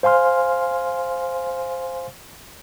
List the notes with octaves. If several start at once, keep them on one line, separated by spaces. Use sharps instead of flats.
C5 F5 G#5 C6 F6